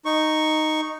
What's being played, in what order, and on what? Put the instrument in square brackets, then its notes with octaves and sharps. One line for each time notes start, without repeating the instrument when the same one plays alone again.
[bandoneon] D#4 C#6